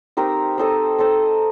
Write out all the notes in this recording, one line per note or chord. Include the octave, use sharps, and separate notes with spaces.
C4 D#4 G4 A#4
C4 D#4 A4 D#5
C4 D#4 A4 D#5